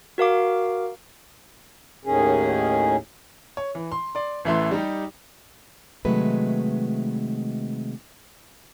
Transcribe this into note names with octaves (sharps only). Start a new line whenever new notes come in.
F#4 A#4 F5 D6
D#2 A2 D#3 C#4 G#4
C#5
E3
C6
D5 C6
A1 E3 A3 E5 C6
G3 D#4 G4
C3 D#3 F#3 G#3 A3 B4